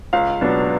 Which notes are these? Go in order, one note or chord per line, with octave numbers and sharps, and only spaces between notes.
C#2 F5
B2 F#3 B3 D4